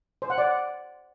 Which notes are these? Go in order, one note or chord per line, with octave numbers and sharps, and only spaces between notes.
C5
F#5
D5